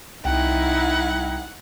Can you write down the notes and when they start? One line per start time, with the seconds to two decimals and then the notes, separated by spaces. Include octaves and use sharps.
0.25 C2 D#4 E4 F#5 G5